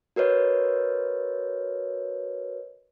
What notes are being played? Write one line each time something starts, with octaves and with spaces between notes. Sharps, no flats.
F#4 A#4 B4 C#5 D#5